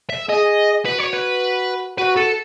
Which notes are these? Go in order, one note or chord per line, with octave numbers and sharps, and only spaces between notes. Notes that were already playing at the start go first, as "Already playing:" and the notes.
E5
G#4 D#5
F#4 B4
C#5
B4
F#4 B4
A4